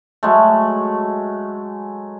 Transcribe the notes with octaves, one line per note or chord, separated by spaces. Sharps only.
F#3 G#3 A3